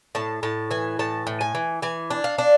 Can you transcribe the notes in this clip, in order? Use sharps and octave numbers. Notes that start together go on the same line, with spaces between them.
A2 A5
A2 A5
E3 G#5
A2 A5
A2
G#5
E3
E3 G#5
D4
F5
D4